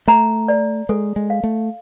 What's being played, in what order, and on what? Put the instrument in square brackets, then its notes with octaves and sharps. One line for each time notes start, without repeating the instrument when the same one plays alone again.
[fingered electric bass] A3 [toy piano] A#5
[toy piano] D5
[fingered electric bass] G#3 [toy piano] A4
[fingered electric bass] G#3
[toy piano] F5
[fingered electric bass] A3